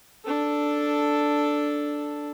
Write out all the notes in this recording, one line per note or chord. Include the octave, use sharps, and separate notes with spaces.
D4 A4